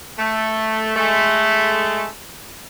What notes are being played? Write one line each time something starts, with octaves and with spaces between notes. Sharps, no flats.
A3
G#3 A3